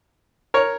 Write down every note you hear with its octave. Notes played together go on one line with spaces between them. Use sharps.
A#4 C#5